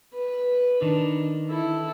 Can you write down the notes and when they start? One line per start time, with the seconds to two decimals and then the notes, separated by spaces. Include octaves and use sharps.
0.14 B4
0.82 D#3 D4
1.47 E4 A4